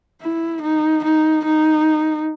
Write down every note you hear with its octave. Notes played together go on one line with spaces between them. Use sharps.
E4
D#4
D#4
D#4